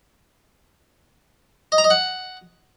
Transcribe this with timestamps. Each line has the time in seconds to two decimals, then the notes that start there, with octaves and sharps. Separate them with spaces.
1.72 D#5
1.78 A#5
1.84 D#5
1.90 F#5